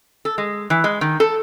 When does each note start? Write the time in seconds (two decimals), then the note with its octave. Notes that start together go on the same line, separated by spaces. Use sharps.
0.25 A4
0.38 G#3
0.70 E3
0.84 G#3
1.01 D#3
1.20 A4